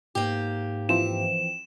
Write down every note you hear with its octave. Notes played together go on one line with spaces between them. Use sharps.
G#2 A#3 G4
E3 F3 C4 E7